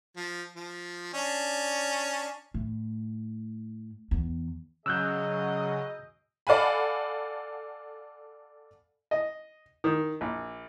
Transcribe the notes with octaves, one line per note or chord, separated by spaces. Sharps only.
F3
F3
C#4 D4
A2
E2
C#3 F#3 G#4 D#5 E6 F#6 G6
A4 D5 F5 F#5 G#5 B5
D#5
D#3
A#1